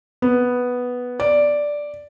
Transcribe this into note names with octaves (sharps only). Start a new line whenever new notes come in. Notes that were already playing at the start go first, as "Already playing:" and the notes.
B3
D5